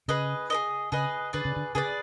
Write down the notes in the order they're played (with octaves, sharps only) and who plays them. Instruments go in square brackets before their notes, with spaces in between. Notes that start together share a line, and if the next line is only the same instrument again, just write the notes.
[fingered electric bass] C#3 [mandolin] G#4 B4 D#5
[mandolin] G#4 B4 D#5
[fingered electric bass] C#3 [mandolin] G#4 B4 D#5
[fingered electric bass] D3 [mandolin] G#4 B4 D5
[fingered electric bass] C#3
D3
[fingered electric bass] C#3 [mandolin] G#4 B4 D5